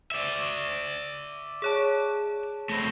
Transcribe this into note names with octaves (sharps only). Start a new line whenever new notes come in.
D5 E5
G#4 C#5 A5
A3 C4 B5 A#6